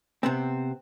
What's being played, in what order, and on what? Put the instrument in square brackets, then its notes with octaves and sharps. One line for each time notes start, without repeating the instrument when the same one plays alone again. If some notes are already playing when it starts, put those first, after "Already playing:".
[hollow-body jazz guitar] C3 B3 C4